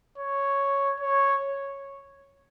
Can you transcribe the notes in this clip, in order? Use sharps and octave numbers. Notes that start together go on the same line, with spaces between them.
C#5
C#5